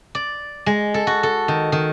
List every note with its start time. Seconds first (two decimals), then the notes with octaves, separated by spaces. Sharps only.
0.15 D5
0.66 G#3
0.94 A4
1.07 F#4
1.23 A4
1.48 D#3
1.72 D#3